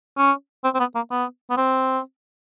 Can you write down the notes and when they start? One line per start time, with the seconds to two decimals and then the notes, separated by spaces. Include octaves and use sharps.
0.17 C#4
0.64 C4
0.75 C4
0.80 B3
0.95 A#3
1.11 B3
1.50 B3
1.57 C4